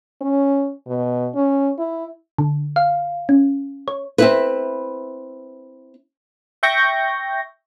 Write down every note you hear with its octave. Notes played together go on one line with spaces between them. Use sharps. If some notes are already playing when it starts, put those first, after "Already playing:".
C#4
B2
C#4
E4
D3
F5
C#4
C#5
C4 E4 B4
E5 G5 C#6 G6 A#6